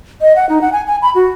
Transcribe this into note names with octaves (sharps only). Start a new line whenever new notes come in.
D#5
F#5
D#4
F#5
G#5
G#5
B5
F#4